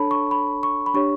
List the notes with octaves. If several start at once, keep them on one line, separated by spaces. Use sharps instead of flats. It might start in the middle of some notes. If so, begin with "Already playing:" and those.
Already playing: D4 A4 C#5 A5 B5
C#6
B5
C#6
B5
D4 G4 C#5 C#6